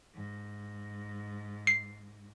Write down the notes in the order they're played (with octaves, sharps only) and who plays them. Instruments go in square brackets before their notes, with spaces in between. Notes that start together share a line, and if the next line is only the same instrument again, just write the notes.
[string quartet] G#2
[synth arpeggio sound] C7